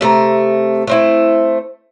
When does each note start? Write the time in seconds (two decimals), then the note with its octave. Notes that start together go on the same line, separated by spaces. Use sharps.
0.01 C3 A3 A#4 A#5
0.87 A3 C4 E4